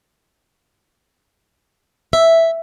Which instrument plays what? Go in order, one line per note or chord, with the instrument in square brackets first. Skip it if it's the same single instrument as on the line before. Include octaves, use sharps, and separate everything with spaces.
[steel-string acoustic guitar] E5